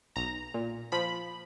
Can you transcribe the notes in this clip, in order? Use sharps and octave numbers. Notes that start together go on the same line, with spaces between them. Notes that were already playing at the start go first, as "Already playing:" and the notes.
B1 A#5
A#2
F3 B5